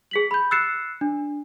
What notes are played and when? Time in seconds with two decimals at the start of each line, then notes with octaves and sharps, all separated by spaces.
0.11 G#4 B6 F#7
0.31 B5 G6
0.51 E6 F#6 A6 C7 C#7 E7
1.01 D4